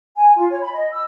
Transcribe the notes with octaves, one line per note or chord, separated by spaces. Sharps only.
G#5
F4
C#5
B5
D#5
E6